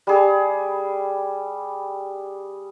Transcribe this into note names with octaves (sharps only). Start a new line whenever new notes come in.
G3 G#4